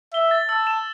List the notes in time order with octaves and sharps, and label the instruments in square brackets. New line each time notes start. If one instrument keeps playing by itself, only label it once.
[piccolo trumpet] E5 [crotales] G7
[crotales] A6
[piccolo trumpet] A5 [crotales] E6
[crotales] E7